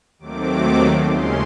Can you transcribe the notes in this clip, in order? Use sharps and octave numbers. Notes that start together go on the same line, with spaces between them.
D#2 D#3 F#3 A3 C4 D6
D#2 C#3 F3 G#3 C#4 C6